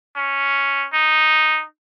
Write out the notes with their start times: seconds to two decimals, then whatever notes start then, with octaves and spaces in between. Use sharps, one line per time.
0.16 C#4
0.93 D#4